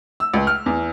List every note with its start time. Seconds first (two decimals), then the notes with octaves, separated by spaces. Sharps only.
0.20 E6
0.34 C#2
0.47 F6
0.66 E2